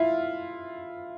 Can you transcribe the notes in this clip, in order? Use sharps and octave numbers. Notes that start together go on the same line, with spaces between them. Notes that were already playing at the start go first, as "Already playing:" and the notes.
Already playing: E4 F4